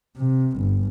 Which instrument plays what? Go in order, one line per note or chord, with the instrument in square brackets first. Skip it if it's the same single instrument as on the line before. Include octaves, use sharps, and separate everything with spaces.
[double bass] C3
G1